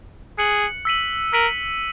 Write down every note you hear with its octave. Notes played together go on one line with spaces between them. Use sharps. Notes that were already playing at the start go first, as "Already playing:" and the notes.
G#4 F#6 C#7 F#7
E6 B6 D#7 F#7
A#4 E6 B6 D#7 F#7